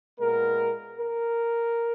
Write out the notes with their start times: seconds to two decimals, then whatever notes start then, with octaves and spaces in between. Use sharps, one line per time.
0.19 A#2 G#3 B3 A#4
0.97 A#4